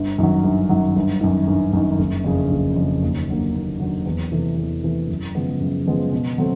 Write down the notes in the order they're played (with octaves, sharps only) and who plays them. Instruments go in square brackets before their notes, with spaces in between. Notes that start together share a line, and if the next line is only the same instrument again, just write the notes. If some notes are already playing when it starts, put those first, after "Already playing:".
Already playing: [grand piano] G1
F#2 D#3 F#3
G1
F#2 D#3 F#3
G1
F#2 D#3
G1
F#2 D#3
F#1
F2 C#3
F#1
F2 C#3
D#2
D3 F#3 A#3
D#2
D3 F#3 A#3
E2
C3 E3 A3
E2
C3 E3 A3
F#2
C#3 F3 G#3 B3
F#2
C#3 F3 G#3 B3
B2
F#3 A3 C4